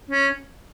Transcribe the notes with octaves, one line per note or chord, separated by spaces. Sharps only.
C#4